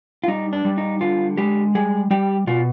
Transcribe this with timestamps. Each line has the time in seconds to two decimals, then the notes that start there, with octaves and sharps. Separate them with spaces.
0.24 F4
0.28 G3 D#4
0.53 D4
0.65 G3
0.78 D#4
1.01 D3 F4
1.37 G#3 G4
1.75 G3 G#4
2.11 G3 G4
2.47 B2 F4